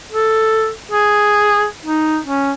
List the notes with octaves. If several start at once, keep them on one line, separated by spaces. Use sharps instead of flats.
A4
G#4
D#4
C#4